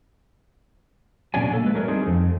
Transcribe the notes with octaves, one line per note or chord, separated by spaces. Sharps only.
A#2 F#3 C#4 D4 C#5 G#5
A#3 A4
G#3 B4
F#3 G3 A3 A#4 C#5
C4 D4 D#4 G#4
F2